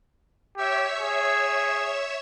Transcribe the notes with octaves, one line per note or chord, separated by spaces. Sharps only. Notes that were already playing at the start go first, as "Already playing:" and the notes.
G4 C#5 E5 E6
G#4